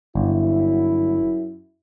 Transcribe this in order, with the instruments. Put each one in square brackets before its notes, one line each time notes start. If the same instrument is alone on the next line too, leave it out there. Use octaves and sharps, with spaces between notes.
[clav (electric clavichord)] G1 [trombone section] F#2 E4